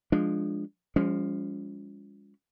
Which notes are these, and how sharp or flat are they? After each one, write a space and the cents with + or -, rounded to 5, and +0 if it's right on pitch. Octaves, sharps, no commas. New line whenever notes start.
F3 +0 G#3 +0 D4 +0
F3 +0 G#3 -40 C#4 +30